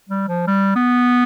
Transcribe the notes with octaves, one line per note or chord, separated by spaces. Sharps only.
G3
F3
G3
B3